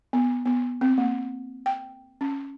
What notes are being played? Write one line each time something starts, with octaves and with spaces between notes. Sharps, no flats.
B3
B3
C4
A#3
G5
C#4